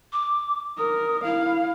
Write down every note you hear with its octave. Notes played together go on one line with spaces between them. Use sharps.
D6
A#4 D#6
E4 F5